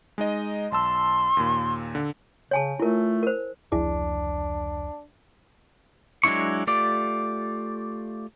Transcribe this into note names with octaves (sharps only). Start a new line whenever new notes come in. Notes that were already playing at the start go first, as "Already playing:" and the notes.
G#3 D#4 D#5
B1 A5 C6 E6
D#2 A#2
D3
C#3 C#5 G#5 A5
A3 E4 F4 A#4
A#4 C5
F1 C#2 F3 D4 E4 G#4 D5
F#3 G#3 D4 E4 C#6
A3 F4 G4 D5